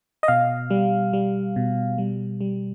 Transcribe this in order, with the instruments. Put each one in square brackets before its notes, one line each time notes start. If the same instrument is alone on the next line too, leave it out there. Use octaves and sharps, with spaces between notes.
[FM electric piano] D#5
B2 F5
G3
G3
B2
G3
G3